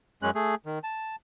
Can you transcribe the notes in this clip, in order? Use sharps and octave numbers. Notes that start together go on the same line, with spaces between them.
F#2 G#3 C#4 F#6
A3 G#4
D#3
A5